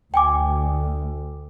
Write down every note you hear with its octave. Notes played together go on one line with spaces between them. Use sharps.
D2 G5 G#5 D6